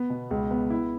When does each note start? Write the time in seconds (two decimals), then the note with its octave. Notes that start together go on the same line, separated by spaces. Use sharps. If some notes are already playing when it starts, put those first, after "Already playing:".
Already playing: B3
0.10 B2
0.31 C#2
0.51 B3
0.70 E4